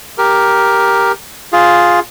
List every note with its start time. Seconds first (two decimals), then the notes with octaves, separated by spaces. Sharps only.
0.18 G4 A#4
1.52 F4 G#4